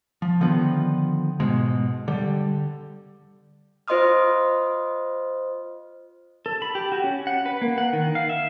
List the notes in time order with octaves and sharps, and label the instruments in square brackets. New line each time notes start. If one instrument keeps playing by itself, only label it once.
[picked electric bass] F3
D3 D#3 F3 B3
G#2 B2 G#3
D3 G3
[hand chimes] F4 C5 D#5 C6 D#6 F6
[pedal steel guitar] A4
B5
G4
F#4
C#4
F#5
B4
A#3
F#5
D#3
F5
E5